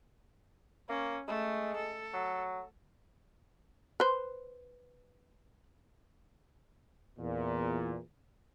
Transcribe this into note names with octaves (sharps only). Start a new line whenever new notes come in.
A#3 C#4
G#3 A3
A4
F#3
B4 C5
E2 A#2